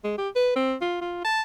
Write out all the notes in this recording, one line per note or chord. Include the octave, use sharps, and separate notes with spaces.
G#3
G4
B4
C4
F4
F4
A5